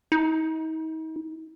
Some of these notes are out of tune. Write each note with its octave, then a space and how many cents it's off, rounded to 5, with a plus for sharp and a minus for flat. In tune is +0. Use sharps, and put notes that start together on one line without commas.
D#4 +40